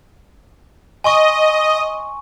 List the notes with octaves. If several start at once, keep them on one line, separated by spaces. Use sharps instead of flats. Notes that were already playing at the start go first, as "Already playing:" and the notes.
D#5 G#5 C6 C#6